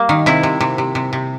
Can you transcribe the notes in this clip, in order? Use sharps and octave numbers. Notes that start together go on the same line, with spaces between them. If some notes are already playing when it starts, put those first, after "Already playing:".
Already playing: G3 A#3
D#3
C3 E4
C3
C3
C3
C3
C3